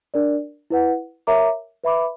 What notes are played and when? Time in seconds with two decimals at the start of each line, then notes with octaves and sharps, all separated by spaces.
0.14 D4 A#4 D5
0.70 E4 B4 F#5
1.27 A#4 C#5 E5 A#5 D6
1.83 B4 E5 B5 D6